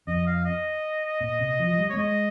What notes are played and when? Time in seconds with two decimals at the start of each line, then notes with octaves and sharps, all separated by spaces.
0.07 F2 D#5
0.27 F5
0.45 D#5
1.21 A#2
1.40 C3
1.59 F3
1.71 F3
1.78 G3
1.90 C#5
1.93 A#3
1.97 G#3 D#5